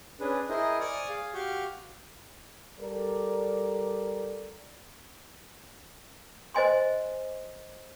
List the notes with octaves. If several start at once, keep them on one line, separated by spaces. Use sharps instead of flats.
C#4 D4 G#4 B4
E4 G#4 A#4 C5 D#5
D5 G#5 C#6 D#6 F6
G#4 F5
F#4 G4 F5 C#6 F6 G6
G3 A4 A#4 D5
C5 D#5 G#5 C6